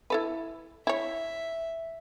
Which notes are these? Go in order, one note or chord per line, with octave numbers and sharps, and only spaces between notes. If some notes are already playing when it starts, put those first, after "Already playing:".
E4 A4 B4
E4 C#5 E5